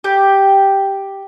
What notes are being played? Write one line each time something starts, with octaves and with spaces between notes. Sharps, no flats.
G4